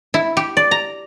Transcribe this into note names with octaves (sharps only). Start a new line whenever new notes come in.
E4
G4
D5
A#5